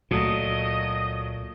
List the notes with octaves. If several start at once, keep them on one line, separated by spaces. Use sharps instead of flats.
C#2 A#2 F#3 A3 D#5 D#6